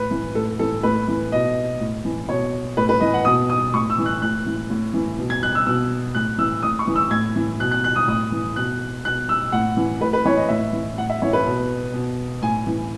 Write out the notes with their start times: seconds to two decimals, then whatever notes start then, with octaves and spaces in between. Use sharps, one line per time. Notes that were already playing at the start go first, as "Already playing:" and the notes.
Already playing: A2 B4
0.11 E3
0.35 A2 A4
0.59 E3 A4
0.83 A2 B4
1.08 E3
1.32 B2 D#5
1.80 A2
2.05 E3
2.29 B2 C#5
2.77 A2 B4
2.89 B4
3.00 E3 D#5
3.14 F#5
3.25 B2 D#6
3.50 D#6
3.74 A2 C#6
3.90 E6
3.98 E3
4.06 F#6
4.22 A2 F#6
4.46 E3
4.70 A2
4.94 E3
5.18 B2
5.30 G#6
5.43 F#6
5.55 E6
5.66 B2 E6
6.15 A2 F#6
6.38 E3 E6
6.63 A2 D#6
6.79 C#6
6.87 E3
6.96 E6
7.11 A2 G#6
7.36 E3
7.59 B2 F#6
7.71 F#6
7.84 F#6
7.96 D#6
8.07 A2 D#6
8.32 E3
8.56 B2 F#6
9.04 B2 F#6
9.29 E6
9.52 A2 F#5
9.77 E3
10.01 A2 B4
10.13 B4
10.25 E3 C#5
10.37 D#5
10.49 A2 E5
10.73 E3
10.97 A2 F#5
11.10 E5
11.22 E3 C#5
11.33 B4
11.46 B2
11.94 B2
12.42 A2 G#5
12.67 E3